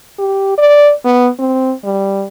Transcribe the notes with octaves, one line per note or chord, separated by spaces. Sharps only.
G4
D5
B3
C4
G3